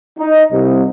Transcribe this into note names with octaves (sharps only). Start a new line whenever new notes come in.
D#4
C2